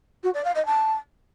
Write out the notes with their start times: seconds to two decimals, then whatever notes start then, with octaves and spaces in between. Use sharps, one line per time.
0.23 F#4
0.34 D5
0.44 F5
0.55 D#5
0.65 A5